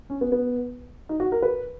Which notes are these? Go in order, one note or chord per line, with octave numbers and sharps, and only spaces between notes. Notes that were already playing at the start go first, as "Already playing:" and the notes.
C#4
B3
B3
D#4
F#4
A#4
B4